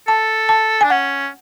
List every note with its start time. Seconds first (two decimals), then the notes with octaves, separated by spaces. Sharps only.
0.07 A4 A5
0.49 A5
0.81 D4 G#5
0.90 C#4 F#5